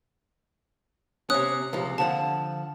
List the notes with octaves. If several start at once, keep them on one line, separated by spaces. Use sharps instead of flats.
C3 C#4 D#6 F#6
C#2 C3 F3
D3 F3 F#5 A5